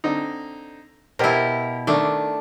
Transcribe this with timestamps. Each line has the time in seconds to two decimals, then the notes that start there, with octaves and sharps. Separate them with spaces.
0.04 D3 C4 D#4
1.19 B2 E4 G4 A#4 C5
1.87 D#3 A3 D4